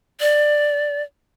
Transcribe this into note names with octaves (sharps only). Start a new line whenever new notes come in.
D5